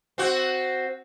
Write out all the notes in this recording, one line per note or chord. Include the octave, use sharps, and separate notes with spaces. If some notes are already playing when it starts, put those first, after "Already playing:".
C4 F#4